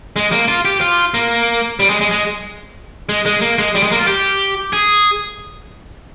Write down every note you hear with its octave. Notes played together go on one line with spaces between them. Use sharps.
G#3
A#3
F4
G4
F4
A#3
G3
G#3
G#3
G#3
G#3
G#3
A#3
G#3
G3
G#3
A#3
F4
G4
G#4